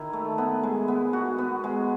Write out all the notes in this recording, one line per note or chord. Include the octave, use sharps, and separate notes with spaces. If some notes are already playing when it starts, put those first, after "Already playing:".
Already playing: D#3 E4
A3
B3
G#3
B3
F#4
B3
G#3